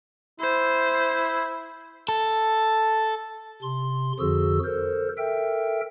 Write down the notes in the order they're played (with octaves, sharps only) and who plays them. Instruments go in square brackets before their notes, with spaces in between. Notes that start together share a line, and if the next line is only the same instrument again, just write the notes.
[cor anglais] E4 [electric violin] C5
[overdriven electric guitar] A4
[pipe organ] C3 C6
F2 D3 F3 F#4 G#4 E6
A4 A#4 C5
A4 A#4 E5 G5